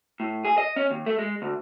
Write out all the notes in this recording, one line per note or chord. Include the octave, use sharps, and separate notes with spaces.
A2
G#4
D#5
C#4
D#2
A3
G#3
D2